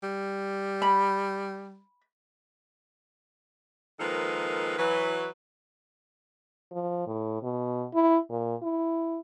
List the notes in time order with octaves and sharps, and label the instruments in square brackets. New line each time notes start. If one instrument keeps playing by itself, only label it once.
[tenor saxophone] G3
[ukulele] B5
[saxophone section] D#3 F3 G#3 A#3 A4 B4
E3 F#3 B4
[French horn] F3
A2
B2
E4
A#2
E4